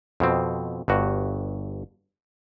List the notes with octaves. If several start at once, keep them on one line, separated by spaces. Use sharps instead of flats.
F2 B2 C4
G1 G2 F#4